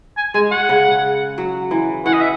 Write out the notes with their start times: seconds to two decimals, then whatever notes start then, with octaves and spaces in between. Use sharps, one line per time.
0.17 G#5
0.34 G#3 G#5
0.51 F#5
0.69 C#3
1.38 F#3
1.71 E3
2.06 E3 F#5
2.13 D#5
2.21 E5